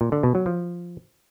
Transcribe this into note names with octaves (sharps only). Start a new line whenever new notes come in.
A#2
D3
B2
F#3
F3